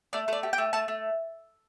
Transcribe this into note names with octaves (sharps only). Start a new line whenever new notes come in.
A3 D5
A3 D5
G4
G5
A3
A3 A5
A3